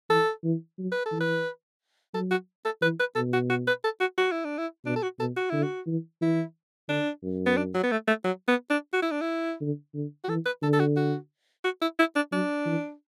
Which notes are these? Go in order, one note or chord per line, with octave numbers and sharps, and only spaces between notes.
E3 A4
E3
F#3
B4
A4
E3
B4
F#3 A4
F#4
A4
E3 B4
B4
B2 A4
F#4
F#4
B4
A4
F#4
F#4
E4
D4
E4
B2 D4
A4
F#4
B2 A4
F#4
D3 E4
F#4
E3
E3 E4
D3 D4
F#2
B3
D4
F#3
B3
A3
A3
F#3
B3
D4
F#4
E4
D4
E4
D3
D3
F#4
E3 A4
B4
D3 A4
A4
F#4
F#4
F#4
E4
E4
D4
F#3 D4
E3